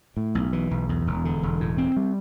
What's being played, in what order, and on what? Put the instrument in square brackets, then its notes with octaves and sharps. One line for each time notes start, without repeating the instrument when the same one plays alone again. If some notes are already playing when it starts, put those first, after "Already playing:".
[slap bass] A2
B1
E3
B1
E2
E1
D3
E1
A2
C4
G3